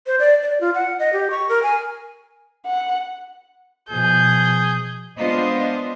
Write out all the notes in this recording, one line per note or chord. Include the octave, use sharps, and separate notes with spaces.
C5
D5
D5
F4
F#5
D#5
G4
C#6
A#4
G#5
F#5
B2 F3 G#4 G6
G#3 B3 D4 F4 C5 D#5